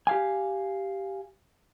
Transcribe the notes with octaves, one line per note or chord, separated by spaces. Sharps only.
G4 F5 G#5